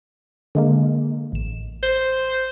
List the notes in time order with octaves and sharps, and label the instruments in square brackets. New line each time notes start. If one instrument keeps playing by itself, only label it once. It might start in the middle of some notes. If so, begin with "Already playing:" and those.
[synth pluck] D3 G#3 A#3
A1 E7
[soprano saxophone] C5